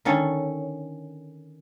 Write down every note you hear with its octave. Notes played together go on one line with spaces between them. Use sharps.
D3 D#3 C#4 A4 C#5